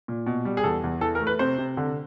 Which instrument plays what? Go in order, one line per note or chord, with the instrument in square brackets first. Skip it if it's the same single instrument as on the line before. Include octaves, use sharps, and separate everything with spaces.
[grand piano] A#2
B2
G3
G#4
E2 A4
E2
E3 A4
A#4
A3
B4
C3 C5
C3
D3